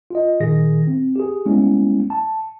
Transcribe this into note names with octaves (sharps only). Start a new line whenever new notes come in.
F4 D#5
A#2 D#3 G#4 A#6
C4
G4 G#4
G3 G#3 A#3 B3 C#4 E4
A5